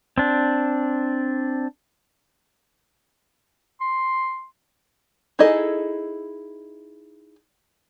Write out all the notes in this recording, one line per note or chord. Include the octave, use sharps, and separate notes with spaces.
C4 D4
C6
D#4 E4 G#4 A4 D#5